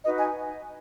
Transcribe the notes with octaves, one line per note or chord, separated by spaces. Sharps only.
D#4 F#4 B4 D#5
G#5